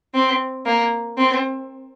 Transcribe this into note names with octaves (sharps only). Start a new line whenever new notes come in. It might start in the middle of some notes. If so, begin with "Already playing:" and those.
C4
A#3
C4